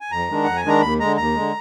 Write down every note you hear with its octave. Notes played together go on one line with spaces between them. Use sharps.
G#5
F2 A#5
D#3 G#3 D4
F2 F#5
G#5
D#3 G#3 D4 A#5
D#2 B5
D3 G#3 A#5
D#2 A#5
D3 G#3